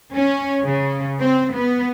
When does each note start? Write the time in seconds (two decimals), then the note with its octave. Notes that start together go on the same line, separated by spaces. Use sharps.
0.12 C#4
0.64 C#3
1.20 C4
1.55 B3